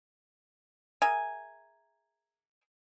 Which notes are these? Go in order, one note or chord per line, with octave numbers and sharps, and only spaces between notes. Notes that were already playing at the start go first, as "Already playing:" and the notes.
G#4 A#4 E5 G#5